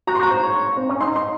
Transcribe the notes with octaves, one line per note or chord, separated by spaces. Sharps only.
F#4 A#5
C6
F#4 A#5
C5
C#5
C4
C#4
D#4 C6
C6